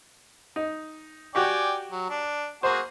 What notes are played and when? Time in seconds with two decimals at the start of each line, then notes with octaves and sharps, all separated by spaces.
0.56 D#4
1.35 F#4 G4 D5 G5 G#5 C#6
1.91 F#3
2.10 D4
2.63 A#3 F#4 G#4 C5